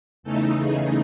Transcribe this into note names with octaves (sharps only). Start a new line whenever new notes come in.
E2 C#3 E3 A3 D#4 A4
G#4